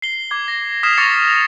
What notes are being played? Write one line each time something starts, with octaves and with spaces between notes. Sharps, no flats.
C7 G7
D6 G#6
A#6
D#6 F6 G#6 B6 C7 E7
C#6 D6 A6 A#6 C#7 F7